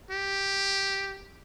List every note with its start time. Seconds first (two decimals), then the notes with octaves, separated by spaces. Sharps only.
0.11 G4